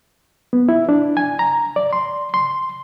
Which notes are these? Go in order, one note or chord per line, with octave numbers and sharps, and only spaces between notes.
B3
E4
D4
G#5
A#5
D5
C6
C6